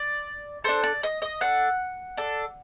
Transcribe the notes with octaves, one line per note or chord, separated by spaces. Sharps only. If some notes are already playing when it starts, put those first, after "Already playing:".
Already playing: D5
D4 A4 C5
D5
D#5
D#5
D4 A4 F#5
D4 A4